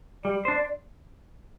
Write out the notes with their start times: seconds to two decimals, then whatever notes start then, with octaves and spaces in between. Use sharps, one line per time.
0.24 G3 D5
0.45 D4 C5